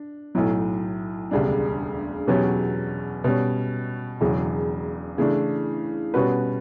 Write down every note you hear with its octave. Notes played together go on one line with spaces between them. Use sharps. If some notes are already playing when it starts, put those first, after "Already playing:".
Already playing: D4
B1 A2 F#3
E1 D2 C#3 G3 D4
E2 B2 F#3 C#4 G4
B2 G3 C#4
E1 E2 C#3 F#3
C#3 E3 A3 D4
B2 G3 C#4 F#4 B4